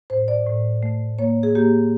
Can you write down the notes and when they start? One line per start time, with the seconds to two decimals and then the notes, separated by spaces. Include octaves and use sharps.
0.10 A2 C5
0.28 D5
0.46 A2
0.83 A3
1.19 A#3 C#5
1.43 G#4
1.55 A#3 G4